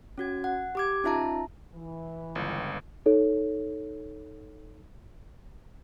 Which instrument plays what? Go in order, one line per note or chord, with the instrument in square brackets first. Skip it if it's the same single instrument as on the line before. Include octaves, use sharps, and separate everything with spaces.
[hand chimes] C#4 F#4 G#6
F#5
G4 D6 G#6
C#4 D#4 F4 E5 A5 A#5
[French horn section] E3
[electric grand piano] G1 C#2
[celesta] D#4 A4 C#5